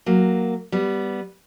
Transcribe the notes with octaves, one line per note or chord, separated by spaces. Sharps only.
F#3 A#3
G3 B3